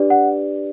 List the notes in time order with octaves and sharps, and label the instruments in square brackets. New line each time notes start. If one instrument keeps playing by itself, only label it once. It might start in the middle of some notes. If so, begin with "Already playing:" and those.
Already playing: [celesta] D4 G4 B4 D5
F#5